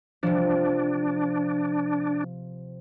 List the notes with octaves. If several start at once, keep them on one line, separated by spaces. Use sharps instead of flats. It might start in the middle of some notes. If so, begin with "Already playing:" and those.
C3 F3 D4